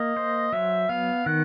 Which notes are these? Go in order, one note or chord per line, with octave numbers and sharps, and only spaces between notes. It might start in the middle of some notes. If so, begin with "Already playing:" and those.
Already playing: A#3 D#5
C5
F#3 E5
B3 F5
D#3 F#5